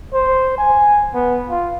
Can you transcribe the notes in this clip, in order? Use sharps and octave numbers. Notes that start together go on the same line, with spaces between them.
C5
G#5
B3
F4